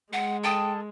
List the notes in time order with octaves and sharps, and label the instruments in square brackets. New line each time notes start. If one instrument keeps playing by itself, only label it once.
[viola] G#3 [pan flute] F#5
[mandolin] A4 A5 D#6 [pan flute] G5